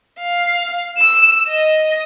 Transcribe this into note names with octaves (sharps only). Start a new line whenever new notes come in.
F5
E6 E7
D#5